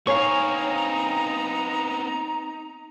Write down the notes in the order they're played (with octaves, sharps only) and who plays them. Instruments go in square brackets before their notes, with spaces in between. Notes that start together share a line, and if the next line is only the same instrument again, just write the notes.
[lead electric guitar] B3 C4 [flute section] D#4 A#5 [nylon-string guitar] C#5 [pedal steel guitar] F5 G#5 C#6